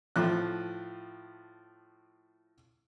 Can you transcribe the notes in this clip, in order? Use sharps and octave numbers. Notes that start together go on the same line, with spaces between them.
A2 F3 F#6